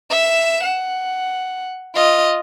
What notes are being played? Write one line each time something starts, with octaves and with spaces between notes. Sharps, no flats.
E5 E7
F#5
F4 D#5